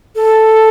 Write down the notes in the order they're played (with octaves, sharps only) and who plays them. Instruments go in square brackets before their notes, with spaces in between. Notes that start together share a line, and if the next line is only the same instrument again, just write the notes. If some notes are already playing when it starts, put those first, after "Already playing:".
[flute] A4